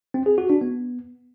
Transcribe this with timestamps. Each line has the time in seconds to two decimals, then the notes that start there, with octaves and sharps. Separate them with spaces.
0.14 C4
0.26 G#4
0.38 F#4
0.50 D4
0.61 B3